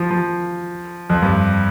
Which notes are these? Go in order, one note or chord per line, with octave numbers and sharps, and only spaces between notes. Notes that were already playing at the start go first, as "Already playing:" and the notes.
Already playing: F3
F3
F2
G2